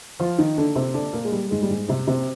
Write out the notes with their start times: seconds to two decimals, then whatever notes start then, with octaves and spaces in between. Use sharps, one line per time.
0.20 F3 F4
0.38 D#3 D#4
0.58 D3 D4
0.75 C3 C4
0.94 D3 D4
1.13 A#2 A#3
1.25 G#3
1.32 G3
1.51 G#2 G#3
1.63 G3
1.70 G#2 G#3
1.88 C3 C4
2.07 C3 C4